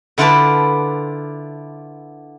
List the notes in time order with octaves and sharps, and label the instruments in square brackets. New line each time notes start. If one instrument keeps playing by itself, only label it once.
[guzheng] D3 E4 F4 B4 D5 A5